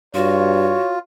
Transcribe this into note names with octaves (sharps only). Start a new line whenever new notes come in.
G2 F4 F#4 C#5